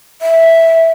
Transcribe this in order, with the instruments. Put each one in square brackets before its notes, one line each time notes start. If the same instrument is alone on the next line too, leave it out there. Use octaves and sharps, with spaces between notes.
[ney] E5